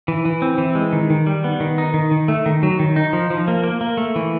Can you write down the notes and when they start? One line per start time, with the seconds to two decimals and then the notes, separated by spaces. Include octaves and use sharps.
0.08 E3
0.25 E3
0.42 C4
0.58 E3
0.75 G#3
0.93 D#3
1.10 D#3
1.27 G3
1.44 B3
1.60 D#3
1.78 D#4
1.94 D#3
2.11 D#3
2.28 A3
2.46 D#3
2.63 F#3
2.79 D#3
2.96 D#4
3.13 F3
3.30 F3
3.48 A#3
3.64 A#3
3.81 A#3
3.97 A3
4.16 E3